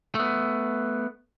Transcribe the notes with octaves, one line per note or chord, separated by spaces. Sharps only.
A3 B3